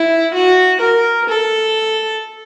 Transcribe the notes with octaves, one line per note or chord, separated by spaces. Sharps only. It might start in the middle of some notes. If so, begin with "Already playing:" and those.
Already playing: E4
F#4
A#4
A4